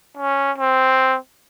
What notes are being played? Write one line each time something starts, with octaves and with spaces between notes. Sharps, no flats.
C#4
C4